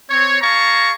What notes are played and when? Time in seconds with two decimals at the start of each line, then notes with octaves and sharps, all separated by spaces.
0.10 C4 C#5
0.42 G#4 F5 A5 A#5 C#6